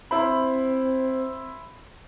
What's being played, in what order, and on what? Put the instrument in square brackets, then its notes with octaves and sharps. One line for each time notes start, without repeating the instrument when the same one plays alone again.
[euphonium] C4 [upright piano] E4 C5 B5